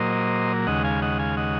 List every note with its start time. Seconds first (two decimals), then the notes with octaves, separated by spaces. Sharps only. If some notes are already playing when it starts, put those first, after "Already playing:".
Already playing: A#2 F#3 A#3 C5 D#5
0.67 D#2 C#3 G#3 D#5 F#5
0.84 F5 G#5
1.02 D#5 F#5
1.19 F5 G#5
1.37 D#5 F#5